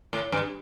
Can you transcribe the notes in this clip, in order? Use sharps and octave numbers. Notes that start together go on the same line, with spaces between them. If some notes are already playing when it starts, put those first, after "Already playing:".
A2
G2